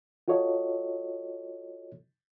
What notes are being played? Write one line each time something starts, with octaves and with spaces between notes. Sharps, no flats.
F4 F#4 A4 C#5 D#5